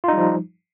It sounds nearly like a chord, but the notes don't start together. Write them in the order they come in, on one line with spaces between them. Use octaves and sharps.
F4 D#4 G3 F3